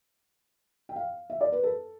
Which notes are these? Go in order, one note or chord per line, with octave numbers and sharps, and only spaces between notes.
G5
F5
E5
D5
B4
A4